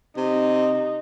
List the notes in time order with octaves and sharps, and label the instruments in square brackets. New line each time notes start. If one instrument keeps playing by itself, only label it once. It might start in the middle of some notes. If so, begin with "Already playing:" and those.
[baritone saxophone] C3 [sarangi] D#4